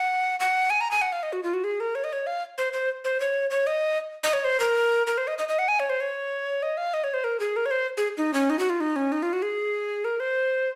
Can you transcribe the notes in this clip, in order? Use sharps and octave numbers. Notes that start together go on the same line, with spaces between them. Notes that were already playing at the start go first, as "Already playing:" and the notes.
Already playing: F#5
F#5
G#5
A#5
G#5
F#5
F5
D#5
F#4
F4
F#4
G#4
A#4
C#5
D#5
C#5
F5
C5
C5
C5
C#5
C#5
D#5
D#5
C#5
C5
A#4
A#4
C5
D#5
D#5
D#5
F#5
G#5
C#5
C5
C#5
D#5
F5
D#5
C#5
C5
A#4
G#4
A#4
C#5
C5
G#4
D#4
C#4
D#4
F#4
F4
D#4
C#4
D#4
F4
F#4
G#4
A#4
C5